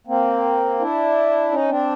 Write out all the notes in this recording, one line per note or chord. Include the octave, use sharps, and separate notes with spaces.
A#3 C4
D4 E4
C#4 D#4
C4 D4